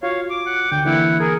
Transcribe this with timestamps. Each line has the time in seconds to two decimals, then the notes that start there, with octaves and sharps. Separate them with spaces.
0.03 F4 F#4 C#5 F5
0.30 D6
0.46 F#5
0.72 D2 D3 G5
0.85 D3 E3 A#3 E4 F#5
1.20 G#4 A#4 G#5